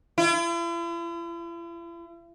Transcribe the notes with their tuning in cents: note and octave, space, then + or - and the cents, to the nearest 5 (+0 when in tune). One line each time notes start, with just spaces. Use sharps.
E4 +45